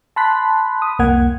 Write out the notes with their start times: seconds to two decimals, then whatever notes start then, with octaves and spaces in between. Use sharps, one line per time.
0.16 A5 B5 C6 F#6 B6
0.82 D#6
0.99 C2 F2 A#3 F#5 G#6